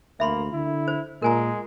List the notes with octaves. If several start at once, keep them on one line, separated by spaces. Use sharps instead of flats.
D2 A#3 E5 B5 C6
D3 E4
C5
A#2 G#3 A#4 G#5 A#5